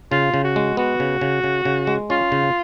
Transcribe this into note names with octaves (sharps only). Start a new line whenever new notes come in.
C#3 F4
C#3
F#4
G#3
B3 F#4
C#3
C#3
C#3
C#3
G#3
C#4 F4
C#3